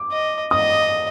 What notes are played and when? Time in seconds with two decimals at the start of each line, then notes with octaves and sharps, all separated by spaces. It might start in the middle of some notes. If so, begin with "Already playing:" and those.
Already playing: D6
0.12 D#5
0.51 D#5 D#6